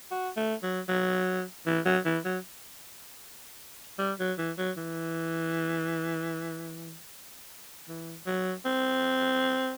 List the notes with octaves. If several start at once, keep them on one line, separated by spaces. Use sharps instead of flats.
F#4
A3
F#3
F#3
E3
F#3
E3
F#3
G3
F#3
E3
F#3
E3
E3
F#3
C4